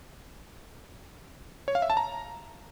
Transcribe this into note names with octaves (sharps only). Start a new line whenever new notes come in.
C#5
F5
E5
A5
A#5